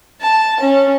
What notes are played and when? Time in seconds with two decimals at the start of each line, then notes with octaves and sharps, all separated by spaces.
0.21 A5
0.60 C#4